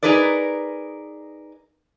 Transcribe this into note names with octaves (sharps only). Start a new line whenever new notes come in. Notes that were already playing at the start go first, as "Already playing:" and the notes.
D#4 G#4 A#4 B4 D5